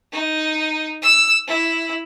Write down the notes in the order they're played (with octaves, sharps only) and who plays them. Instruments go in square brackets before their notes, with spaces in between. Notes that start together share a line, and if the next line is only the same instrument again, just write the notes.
[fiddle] D#4
E6
E4